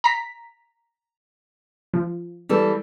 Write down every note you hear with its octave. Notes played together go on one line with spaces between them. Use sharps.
A#5 B6
F3
E3 G3 A4